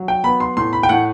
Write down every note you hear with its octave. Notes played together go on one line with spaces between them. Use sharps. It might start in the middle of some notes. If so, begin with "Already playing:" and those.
Already playing: F#3
G5
B3 B5
C6
A2 C6
B5
G5
A2 F#5